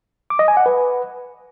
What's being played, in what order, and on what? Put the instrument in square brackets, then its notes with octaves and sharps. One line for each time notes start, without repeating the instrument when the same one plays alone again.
[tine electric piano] D6
D#5
G#5
F#5
B4